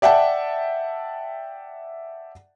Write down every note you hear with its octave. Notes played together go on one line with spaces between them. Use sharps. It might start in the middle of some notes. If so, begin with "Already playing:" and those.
D5 E5 F#5 G5 A5